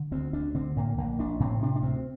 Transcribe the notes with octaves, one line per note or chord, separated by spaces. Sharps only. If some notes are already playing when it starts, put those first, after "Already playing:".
Already playing: D3
D2 C4
D2 D4
D3 C4
A2 A#3
A#1 A#3
A#1 D4
A2 C4
C3 D4
D4
D2 C4